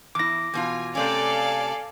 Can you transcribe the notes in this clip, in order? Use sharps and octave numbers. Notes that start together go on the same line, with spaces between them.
E2 E4 D6 A#6
E2 B2 F4 G#5
C3 A3 C#4 A4 D5 F5 G#5